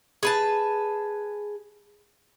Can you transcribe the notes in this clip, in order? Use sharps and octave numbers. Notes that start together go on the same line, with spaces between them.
G#4 B4 A5